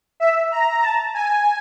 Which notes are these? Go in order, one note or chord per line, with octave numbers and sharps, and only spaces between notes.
E5
A#5
A5
G#5